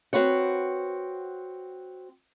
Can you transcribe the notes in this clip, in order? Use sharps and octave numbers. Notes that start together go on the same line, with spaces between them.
C4 F#4 B4 C#5 F#5